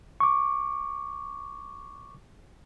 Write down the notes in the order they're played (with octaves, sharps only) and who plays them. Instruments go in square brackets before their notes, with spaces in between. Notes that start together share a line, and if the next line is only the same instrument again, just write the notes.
[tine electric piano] C#6 D6